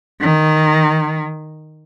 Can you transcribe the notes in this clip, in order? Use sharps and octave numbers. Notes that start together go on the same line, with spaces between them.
D#3